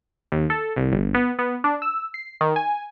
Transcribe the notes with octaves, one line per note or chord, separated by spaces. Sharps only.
D#2
A4
C2
G1
B3
B3
D4
E6
C7
D#3
G#5